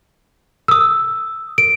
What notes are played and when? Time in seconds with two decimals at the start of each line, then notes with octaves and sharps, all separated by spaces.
0.68 D#6 E6
1.58 D7